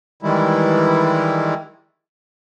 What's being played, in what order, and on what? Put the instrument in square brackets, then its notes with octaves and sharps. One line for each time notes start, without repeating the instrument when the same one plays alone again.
[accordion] D#3 E3 G3 G#3 E4